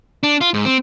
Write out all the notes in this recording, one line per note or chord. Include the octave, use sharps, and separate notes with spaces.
D4
F4
G#2
C4